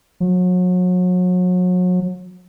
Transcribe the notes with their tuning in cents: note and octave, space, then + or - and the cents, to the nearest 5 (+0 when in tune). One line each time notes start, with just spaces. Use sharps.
F#3 -35